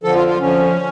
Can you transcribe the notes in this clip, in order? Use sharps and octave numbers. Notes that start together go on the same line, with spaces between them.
F2 D3 F3 A4
F4
F4
F2 D3 F3 C#4